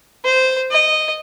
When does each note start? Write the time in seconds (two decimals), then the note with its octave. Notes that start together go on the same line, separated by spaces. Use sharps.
0.25 C5
0.71 D#5